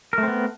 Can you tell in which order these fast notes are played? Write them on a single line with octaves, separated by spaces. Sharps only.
A#4 A3 C4 B3